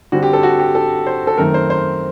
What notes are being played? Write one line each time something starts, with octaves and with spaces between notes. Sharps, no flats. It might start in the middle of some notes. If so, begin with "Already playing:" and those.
D3 G3 C4 F#4
G4
A4
F#4
G4
A4
C5
A4
F#2 D#3 A3 C4 A#4
C5
C5